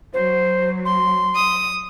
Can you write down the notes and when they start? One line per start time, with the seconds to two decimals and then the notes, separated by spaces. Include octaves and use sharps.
0.14 F#3 C5
0.85 C6
1.36 D#6